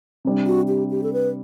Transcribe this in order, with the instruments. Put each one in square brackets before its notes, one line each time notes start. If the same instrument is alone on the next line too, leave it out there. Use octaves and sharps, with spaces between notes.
[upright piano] C3 G3 D4
[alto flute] F#4
G4
G4
A4
B4